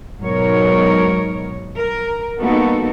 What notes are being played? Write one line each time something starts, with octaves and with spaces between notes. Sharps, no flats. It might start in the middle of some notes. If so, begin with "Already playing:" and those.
G#2 B2 F#3 D#4 A#4 C#5
A#4
G3 A#3 B3 D#4 F#4 A4